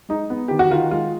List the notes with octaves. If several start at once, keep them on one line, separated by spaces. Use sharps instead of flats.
G#3 D#4
B3
D#3 G4
F#4
D#3 F4
G#3 F4